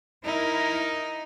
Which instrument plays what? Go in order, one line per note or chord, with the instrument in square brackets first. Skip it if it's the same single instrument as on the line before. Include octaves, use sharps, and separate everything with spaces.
[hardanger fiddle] D#4 [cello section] E4 A#4